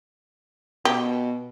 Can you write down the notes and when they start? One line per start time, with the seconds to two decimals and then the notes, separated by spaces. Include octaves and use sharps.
0.85 B2 G4